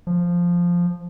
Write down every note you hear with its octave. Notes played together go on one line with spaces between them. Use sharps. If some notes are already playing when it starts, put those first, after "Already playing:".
F3